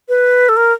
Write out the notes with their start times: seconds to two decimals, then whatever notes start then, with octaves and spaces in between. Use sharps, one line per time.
0.09 B4
0.49 A4
0.57 A#4